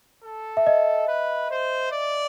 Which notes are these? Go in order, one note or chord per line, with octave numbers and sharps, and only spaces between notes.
A4
E5
D#5
B4
C5
D5